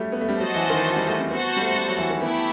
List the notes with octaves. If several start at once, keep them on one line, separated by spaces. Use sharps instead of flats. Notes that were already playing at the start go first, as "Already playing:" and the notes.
Already playing: F#3 G3 A3
B3
A3
G3
F#3 F#4 C5 D#5 F#5 A5
E3
D#3
E3
G3
A3
C4
B3 F#4 C5 F#5 A5
G3
A3
G3
F#3
E3
D#3
A3 B3 E4 G4